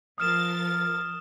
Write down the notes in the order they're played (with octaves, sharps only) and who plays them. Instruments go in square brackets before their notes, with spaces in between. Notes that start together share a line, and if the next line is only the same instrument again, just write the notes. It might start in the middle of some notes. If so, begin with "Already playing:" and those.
[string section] F3 A#4 A6 [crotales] D#6 F6 E7